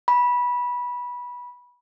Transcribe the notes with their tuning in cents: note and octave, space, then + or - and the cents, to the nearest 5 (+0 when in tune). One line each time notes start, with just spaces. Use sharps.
B5 -15